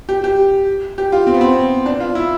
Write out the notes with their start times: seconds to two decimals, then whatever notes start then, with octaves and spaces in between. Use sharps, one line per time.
0.09 G4
0.24 G4
0.98 G4
1.12 F4
1.27 C4
1.34 B3
1.41 C4
1.86 D4
2.00 F4
2.15 E4